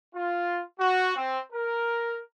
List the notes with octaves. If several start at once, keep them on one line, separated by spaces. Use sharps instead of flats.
F4
F#4
C4
A#4